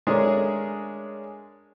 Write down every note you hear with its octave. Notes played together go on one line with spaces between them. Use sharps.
G#3 A3 C#4 D4 G#4 A#4